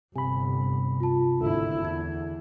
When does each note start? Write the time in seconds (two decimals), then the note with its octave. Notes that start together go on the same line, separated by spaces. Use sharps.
0.16 G1 C3 G#5 B5
1.00 F4 A5
1.39 G#1 D2 D3 E4
1.82 E2 E4 G#6